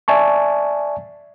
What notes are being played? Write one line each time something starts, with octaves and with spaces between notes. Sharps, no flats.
D5 E5 G#5 A5 C#6